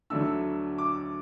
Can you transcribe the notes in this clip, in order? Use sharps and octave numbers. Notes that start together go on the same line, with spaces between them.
D2 D3 F#3 A3 D4 E6
D6